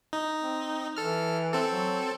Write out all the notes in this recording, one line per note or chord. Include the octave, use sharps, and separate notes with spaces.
D#4
C4
E3 A4 F6
C4 A4
F#3